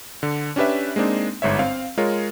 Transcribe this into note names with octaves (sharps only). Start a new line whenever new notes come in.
D3
C#4 D4 G4 B4 E5
G#3 A#3 C4 D4 D#4
G1 G#2 C#5 E5
C4 F5
G#3 F4 A#4 C#5